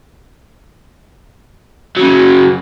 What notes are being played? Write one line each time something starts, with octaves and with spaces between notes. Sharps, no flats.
C#3 F#3